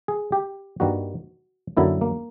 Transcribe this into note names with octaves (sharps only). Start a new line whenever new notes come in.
G#4
G4
G2 D#3 G3 A#3 F#4
F#2 D3 F#3 A#3 E4
A#3